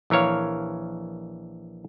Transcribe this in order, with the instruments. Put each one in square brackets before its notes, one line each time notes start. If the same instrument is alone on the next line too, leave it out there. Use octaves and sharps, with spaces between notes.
[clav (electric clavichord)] A#1 E3 A#4 C#5 F5